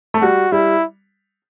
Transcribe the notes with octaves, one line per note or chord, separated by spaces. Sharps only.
A3
G3 F#4
G3 E4